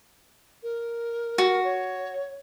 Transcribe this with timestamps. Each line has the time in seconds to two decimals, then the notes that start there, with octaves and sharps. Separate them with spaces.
0.63 A#4
1.38 F#4
1.64 C#5